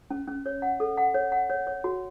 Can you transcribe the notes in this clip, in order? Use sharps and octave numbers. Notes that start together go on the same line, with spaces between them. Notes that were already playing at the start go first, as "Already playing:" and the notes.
C#4
C#4
C#5
F#5
A4
F#5
C#5
F#5
C#5
C#5
F#4